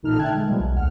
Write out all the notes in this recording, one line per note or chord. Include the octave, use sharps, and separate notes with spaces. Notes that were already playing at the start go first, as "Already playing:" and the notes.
A1 A#2 A3 D#4 A4 F6
D3 E5 G5 A5 F#6 G#6
G#3
B2 F3 G3 G#3 A#3
B1
D2 F#5 F6